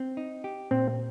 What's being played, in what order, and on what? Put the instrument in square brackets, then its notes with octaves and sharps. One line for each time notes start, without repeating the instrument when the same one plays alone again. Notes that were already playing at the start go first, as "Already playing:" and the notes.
Already playing: [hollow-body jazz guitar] C4
D#4
G4
[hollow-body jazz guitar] A#2 [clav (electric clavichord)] C4